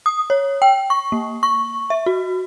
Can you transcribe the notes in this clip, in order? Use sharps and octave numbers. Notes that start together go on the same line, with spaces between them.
D#6
C#5
G5
C#6
A#3
C#6
E5
F#4